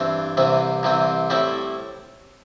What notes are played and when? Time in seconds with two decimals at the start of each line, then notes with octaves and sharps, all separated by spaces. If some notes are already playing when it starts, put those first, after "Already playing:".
Already playing: G2 E3 C4
0.37 C2 C3 E3 C4
0.83 C2 C3 E3 C4
1.30 A2 G3 C4 E4